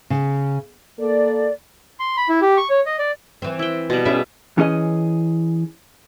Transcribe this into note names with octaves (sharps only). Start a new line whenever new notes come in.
C#3
A#3 A4 D5
C6
B5
E4
G4
C#6
C#5
D#5
D5
E3 C4
E4 G5
B2 G3
C#4 E4 G#4 E5
E3 C#4 G#4 D#5